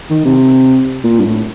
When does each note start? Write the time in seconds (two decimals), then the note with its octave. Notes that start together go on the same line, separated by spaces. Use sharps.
0.10 D#3
0.25 C3
1.04 A#2
1.20 G2
1.26 A2